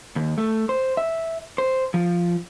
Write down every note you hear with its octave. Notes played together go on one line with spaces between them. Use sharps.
D#2
A3
C5
E5
C5
F3